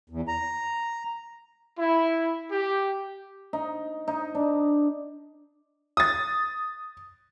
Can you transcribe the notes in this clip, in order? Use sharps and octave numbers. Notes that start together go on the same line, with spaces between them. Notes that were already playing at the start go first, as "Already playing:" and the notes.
E2
A#5
E4
G4
D#4
D#4
D4
D#6 A6